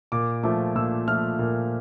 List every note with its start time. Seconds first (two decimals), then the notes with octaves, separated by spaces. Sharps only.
0.12 A#2 D6
0.43 F3 A3 D6
0.75 A#2 E6
1.08 F3 A3 F6
1.39 A#2